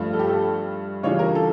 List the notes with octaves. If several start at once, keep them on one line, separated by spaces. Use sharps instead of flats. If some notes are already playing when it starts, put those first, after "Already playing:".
Already playing: G2 F3 A3
A4
G4
A4
C#3 E3 G3 D4 F4 C#5
A#4
A4